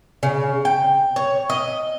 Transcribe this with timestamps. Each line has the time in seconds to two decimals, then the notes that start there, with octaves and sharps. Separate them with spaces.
0.23 C#3
0.65 G5
1.16 C#5
1.50 D#5